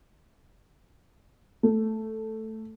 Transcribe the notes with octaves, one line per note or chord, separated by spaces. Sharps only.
A3